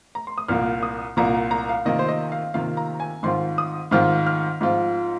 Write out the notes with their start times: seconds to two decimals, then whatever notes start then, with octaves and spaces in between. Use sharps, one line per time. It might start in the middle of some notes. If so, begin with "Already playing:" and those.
0.15 A#5
0.27 C6
0.38 D#6
0.48 C2 A#2 A#3 F6
0.83 D#6
1.17 C2 A#2 A#3 A#5
1.51 A#5
1.69 F5
1.85 C3 D#3 A#3 F4 D#5
1.99 C5
2.08 D#5
2.32 F5
2.54 C3 D#3 A#3 F4 F5
2.77 A#5
3.00 G#5
3.23 G#2 D#3 C4 F4 C6
3.58 D#6
3.91 G#2 D#3 C4 F4 F6
4.26 F6
4.61 G#2 F3 C4 F4